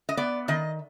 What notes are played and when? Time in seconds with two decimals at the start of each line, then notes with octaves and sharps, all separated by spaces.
0.09 D#5
0.17 B3 D5
0.48 D#3 D#5